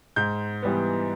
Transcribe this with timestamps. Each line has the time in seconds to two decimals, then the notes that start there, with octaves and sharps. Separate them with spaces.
0.16 G#2 G6
0.62 E3 G3 B3